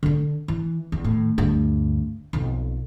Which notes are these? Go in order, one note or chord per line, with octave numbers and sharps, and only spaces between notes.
D3 D4
E3
E2
A2 D#3
D2 G2
B1 F2